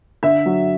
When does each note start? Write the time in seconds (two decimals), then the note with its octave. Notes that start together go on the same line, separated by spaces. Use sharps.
0.23 D3 E5
0.46 F#3